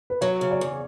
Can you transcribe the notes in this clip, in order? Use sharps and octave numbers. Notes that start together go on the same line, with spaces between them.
B4
F#3 C#5
C#3
D5
E2